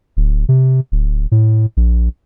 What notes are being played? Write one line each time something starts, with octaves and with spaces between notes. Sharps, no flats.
D1
C3
D1
A2
A#1